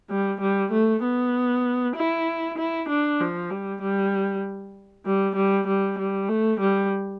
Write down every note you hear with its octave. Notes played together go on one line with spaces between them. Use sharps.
G3
G3
A3
B3
E4
E4
D4
F3
G3
G3
G3
G3
G3
G3
A3
G3